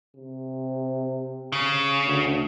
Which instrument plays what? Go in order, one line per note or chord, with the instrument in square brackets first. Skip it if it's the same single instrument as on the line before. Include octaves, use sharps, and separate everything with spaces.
[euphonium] C3
[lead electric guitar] C#3
[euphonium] D2